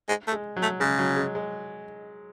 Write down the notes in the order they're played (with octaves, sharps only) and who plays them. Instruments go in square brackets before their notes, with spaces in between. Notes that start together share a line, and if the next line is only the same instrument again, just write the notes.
[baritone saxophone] G#3
A3
[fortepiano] G#3
F#3
[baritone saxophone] A3
[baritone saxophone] C#3 [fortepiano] G#3
[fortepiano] F#3
G#3
G#3